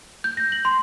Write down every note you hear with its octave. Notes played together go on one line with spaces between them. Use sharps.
G6
A#6
F#7
C6